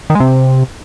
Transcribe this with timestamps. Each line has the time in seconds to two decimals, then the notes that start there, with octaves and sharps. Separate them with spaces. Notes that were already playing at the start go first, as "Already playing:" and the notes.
0.10 D#3
0.15 G#3
0.20 C3